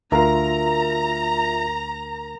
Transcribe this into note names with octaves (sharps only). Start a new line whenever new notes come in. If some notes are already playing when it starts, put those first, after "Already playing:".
D2 F4 A#4 E5 F5 A#5